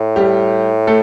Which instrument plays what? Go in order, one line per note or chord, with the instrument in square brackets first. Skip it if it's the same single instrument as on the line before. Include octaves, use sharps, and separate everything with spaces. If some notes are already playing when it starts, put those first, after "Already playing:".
Already playing: [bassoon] A2
[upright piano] G3 G4
A3 A4